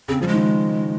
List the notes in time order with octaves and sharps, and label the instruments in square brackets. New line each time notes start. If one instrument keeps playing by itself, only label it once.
[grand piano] C#3 [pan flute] C4
[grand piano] F3 [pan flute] G3
[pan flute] G#3
[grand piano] D#3